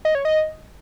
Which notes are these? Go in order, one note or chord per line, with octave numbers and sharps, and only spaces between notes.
D#5
C#5
D#5